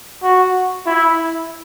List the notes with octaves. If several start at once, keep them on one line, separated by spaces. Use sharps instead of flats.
F#4
E4